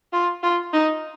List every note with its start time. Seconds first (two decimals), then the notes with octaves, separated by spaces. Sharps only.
0.13 F4
0.43 F4
0.73 D#4